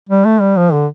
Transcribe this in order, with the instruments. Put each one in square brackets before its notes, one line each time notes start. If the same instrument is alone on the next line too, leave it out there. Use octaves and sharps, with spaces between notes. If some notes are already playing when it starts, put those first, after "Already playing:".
[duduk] G3
A3
G3
F3
D3